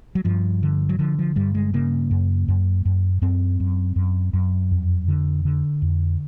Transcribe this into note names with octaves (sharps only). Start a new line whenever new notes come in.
F#3
G2 F3
D3
F#3
D3 F3
F3
G2 G3
G#3
C#3 A#3
F#2
F#2
F#2
F#2 C4
F#2
F#2
F#2
F2
D3
D3
F2